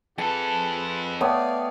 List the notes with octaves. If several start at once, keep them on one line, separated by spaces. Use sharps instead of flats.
F2 G#4 A4 B4 A5
A3 B3 C#5 D5 F5 G5 D#6